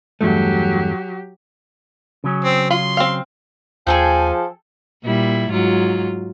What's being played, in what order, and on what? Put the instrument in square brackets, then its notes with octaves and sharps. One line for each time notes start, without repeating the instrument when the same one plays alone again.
[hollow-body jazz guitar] E2 G2 A3 [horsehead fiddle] F#3 G4
[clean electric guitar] C#3 F#3 C#4
[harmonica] C4
[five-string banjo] F4 [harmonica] C6
[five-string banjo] C4 F5
[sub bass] D#2 [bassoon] F3 [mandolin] G#4 A4 G5 [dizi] G#5
[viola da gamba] A#2 G3 E4
G#2 F#3 F4